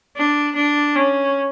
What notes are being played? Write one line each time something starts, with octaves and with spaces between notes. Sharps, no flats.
D4
D4
C#4